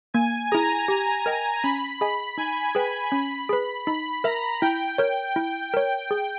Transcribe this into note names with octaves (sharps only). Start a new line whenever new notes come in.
A#3 G#5
E4 G#4 A#5
G4 A#5
A#4 D#5 G5
C#4 B5
G#4 D#5 G#5 B5
D#4 G#5
G#4 B4 G5
C#4 B5
G#4 B4
D#4 B5
A#4 E5 A#5
E4 G5
A#4 C#5
E4
A#4 C#5
G#4